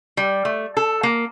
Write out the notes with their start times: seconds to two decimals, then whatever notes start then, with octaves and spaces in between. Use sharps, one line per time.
0.17 G3
0.45 A3
0.77 A4
1.03 A#3